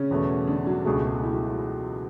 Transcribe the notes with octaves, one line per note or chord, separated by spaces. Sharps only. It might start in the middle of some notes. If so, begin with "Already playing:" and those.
Already playing: C#3 C#4
E2 B2 A3
D3 D4
F#3 F#4
C#2 B2 G#3 A3 G#4
G#4
F#4
E4
F#3 F#4